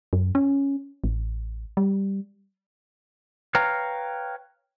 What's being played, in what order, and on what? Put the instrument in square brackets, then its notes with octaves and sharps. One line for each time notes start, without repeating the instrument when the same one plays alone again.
[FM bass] F#2
C#4
A1
G3
[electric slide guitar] B4 C#5 F5 G5 A#5